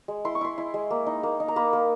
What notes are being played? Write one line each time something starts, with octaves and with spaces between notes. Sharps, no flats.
G#3
E4 C6
C#6
E4 C6
E4
G#3
A#3
D#4
A#3
D#4
A#5
A#3 B5
A#3